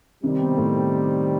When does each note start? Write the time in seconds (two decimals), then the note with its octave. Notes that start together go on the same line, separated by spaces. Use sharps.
0.23 C3 D#3 G3 C4
0.41 B2
0.58 A2